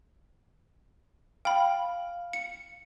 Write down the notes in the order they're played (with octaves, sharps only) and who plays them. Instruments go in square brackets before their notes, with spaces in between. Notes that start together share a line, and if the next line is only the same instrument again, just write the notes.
[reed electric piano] F5 [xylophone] G5 B5
[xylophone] C#7